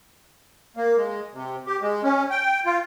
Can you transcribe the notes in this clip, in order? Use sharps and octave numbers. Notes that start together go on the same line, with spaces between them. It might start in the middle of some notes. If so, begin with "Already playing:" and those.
A#3
G#3
C3
G4
G#3
C#4
G5
F4